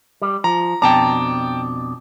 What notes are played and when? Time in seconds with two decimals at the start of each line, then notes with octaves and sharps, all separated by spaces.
0.22 G3
0.44 F3 A#5
0.82 F2 B2 D4 G5 A5 A#5